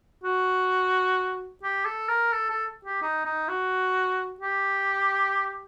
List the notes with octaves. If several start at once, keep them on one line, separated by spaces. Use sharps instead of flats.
F#4
G4
A4
A#4
A4
A4
G4
D#4
D#4
F#4
G4